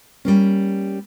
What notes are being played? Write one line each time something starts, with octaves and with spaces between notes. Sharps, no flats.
G3 A#3 C#4